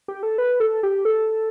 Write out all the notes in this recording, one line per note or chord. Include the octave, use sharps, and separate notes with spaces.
G4
A4
B4
A4
G4
A4